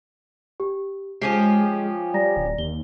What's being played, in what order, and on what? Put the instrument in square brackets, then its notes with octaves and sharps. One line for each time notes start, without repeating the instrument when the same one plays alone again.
[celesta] G4
[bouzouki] F3 C#4 G4 [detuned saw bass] G#3 [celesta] C7
[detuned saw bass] G3 [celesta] D5 A#5 A#6
[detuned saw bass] D1
[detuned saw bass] D#2 [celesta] G7